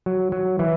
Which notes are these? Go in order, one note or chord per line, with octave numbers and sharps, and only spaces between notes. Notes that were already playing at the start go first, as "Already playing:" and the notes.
F#3
F#3
E3